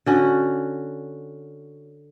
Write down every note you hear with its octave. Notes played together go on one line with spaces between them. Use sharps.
D3 C#4 F#4